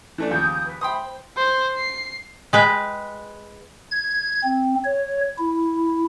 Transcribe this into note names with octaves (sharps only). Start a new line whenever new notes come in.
E3 A3 D4
D#2 C#3 F3 D#6 G6
B4
C5 E5 G5 B5 C6 D#6
C5
C5
C7
G#3 B4 G5
G#6
C4
C#5
E4